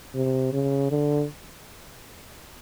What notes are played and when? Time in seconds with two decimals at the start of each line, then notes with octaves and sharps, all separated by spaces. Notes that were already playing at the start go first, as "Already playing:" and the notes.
0.14 C3
0.53 C#3
0.91 D3